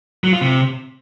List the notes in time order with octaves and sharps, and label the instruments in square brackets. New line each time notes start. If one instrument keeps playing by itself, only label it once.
[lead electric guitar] F#3
F4
C3